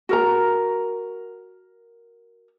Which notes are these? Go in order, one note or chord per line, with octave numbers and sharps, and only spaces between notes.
F#4 A#4 A#5